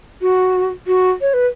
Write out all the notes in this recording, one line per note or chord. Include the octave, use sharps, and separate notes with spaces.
F#4
F#4
C#5
B4